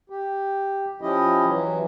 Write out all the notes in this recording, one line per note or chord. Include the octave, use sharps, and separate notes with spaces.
G4
F3 C#4 E4 G4 D#5
E3 F#3